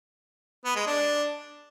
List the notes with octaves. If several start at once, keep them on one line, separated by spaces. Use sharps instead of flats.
B3
G#3
D4